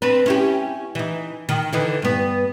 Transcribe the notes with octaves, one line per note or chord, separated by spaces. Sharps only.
C4 D4 B4
C#4 E4 G4
E3 D#4
D#3
D3 E3 D#4
G2 B3